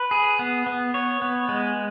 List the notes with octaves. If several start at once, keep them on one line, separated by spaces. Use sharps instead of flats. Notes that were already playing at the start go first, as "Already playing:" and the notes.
Already playing: B4
G#4
B3
B3
C#5
B3
G#3